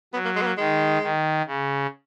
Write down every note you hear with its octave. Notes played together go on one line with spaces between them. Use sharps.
F#3 B3
A#3
G#3
B3
A#3
D#3 G#3
D#3
C#3